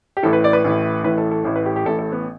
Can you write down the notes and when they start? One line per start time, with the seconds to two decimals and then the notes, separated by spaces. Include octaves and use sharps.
0.17 G4
0.23 A1 A2 E3 A4
0.33 B4
0.44 D5
0.53 B4
0.65 A1 A2 E3
1.04 A1 A2 E3 B4
1.18 A4
1.31 A4
1.45 A1 A2 E3
1.56 B4
1.66 G4
1.76 G4
1.86 A1 A2 E3 A4
1.99 A4
2.12 B3